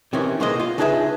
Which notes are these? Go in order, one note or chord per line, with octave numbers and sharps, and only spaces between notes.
C3 D#3 E3 C#4
B1 G#3 A#3 C5 D#5
F4
C#3 D4 D#4 G#4 B4 E5